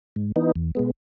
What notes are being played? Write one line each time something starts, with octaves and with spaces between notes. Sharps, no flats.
G#2
E3 B3 D#4
E2
B2 G#3 B3